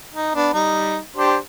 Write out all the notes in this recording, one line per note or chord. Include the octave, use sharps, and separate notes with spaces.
D#4
B3 D4
G3 D#4
D4 G4 C5